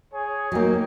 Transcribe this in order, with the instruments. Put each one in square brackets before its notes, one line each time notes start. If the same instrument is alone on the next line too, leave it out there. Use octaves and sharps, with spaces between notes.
[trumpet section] G#4 C#5 G#5
[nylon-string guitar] F#3 A#3 [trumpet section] D#4 C#5 G5